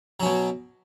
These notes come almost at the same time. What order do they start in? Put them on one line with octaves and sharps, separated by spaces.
F#3 C#4 B2